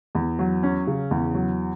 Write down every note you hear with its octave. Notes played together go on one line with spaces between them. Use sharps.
E2
F#3
C#4
C#3
E2
F#3